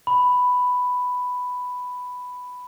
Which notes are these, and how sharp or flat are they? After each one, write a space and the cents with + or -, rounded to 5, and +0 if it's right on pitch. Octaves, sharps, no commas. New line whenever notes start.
B5 +5